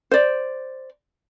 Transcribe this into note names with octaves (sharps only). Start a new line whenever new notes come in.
C5 D5